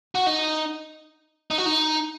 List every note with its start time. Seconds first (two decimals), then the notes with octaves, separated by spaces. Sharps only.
0.15 F#4
0.26 D#4
1.50 D#4
1.58 F#4
1.66 D#4